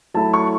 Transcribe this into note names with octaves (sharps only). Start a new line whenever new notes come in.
F#3 A3 E4 A5
C#6